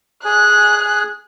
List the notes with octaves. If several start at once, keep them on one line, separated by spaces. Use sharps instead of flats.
G#4 G#5 F#6